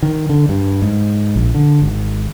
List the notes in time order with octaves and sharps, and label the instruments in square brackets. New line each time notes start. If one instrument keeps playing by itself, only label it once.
[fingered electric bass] D#3
D3
G2
G#2
A#1
D3
G#1